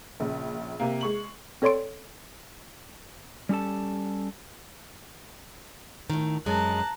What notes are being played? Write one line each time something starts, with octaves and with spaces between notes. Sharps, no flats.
A#1 C#3
C3 A#3
G#3 C#6 F#7
C4 A4 C#5 D5 C6 D7
G3 C#4 G4 A4 A5
A2 D#3
F#2 G#3 A5 A#5 F#6